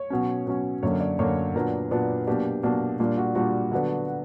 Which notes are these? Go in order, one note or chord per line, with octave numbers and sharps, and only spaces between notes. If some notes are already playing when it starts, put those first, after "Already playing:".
Already playing: C#5
B2 F#3 C#4
B2 F#3 C#4
F#2 D3 A#3 C#5
D5
F#2 D3 A#3 C#5
A#2 F#3 B3 D4 A#4
A#2 F#3 B3 D4
B2 F#3 A#3 D4 G4
B2 F#3 A#3 D4
A#2 G3 A#3 D4
F#4
A#2 G3 A#3 D4 F#4
D3 F#3 B3 D4